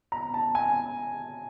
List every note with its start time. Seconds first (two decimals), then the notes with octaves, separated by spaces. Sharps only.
0.12 A#5
0.34 A5
0.55 G#5